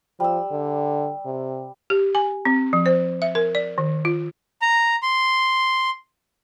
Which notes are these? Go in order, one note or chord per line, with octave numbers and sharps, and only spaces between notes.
F3 G3 E6
D3
C3
G4
G#5
C4
F3
C5
E5
A#4
D5
D#3
F4
A#5
C6